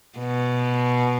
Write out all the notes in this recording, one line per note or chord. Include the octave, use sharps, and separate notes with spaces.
B2